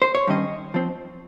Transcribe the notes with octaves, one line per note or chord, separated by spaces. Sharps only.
C5
C#5
G2 D#3 G3 C#4 D#5
F3 C4